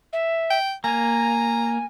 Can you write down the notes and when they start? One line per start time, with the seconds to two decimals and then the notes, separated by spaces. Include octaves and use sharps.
0.13 E5
0.50 G5
0.84 A#3 G#5 A#5